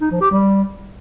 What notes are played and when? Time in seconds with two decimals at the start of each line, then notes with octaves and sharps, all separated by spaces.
0.01 D#4
0.11 F3
0.21 G4
0.31 G3